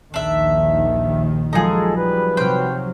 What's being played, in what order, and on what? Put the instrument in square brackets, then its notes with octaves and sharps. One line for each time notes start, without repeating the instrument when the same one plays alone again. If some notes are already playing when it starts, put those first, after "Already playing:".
[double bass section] A#1 D#2 D#3 [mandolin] D4 E5
[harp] F3 F#3 D#4 [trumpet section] G#3 A4 [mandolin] G#4 A#5
[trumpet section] G3 B4
[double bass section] C3 F#3 [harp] C5 F6 [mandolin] G5